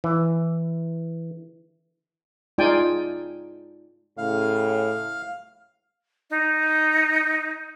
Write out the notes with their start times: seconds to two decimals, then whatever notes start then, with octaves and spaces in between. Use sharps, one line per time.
0.04 E3
2.58 G#3 D#4 F4 D5 G5 G#5
4.18 A2 C#3 F5
6.30 D#4